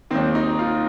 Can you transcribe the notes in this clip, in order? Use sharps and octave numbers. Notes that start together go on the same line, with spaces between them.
D#2 D#3 C4
D#4
F4